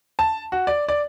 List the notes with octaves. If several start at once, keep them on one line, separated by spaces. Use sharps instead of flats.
A5
F#4
D5
D5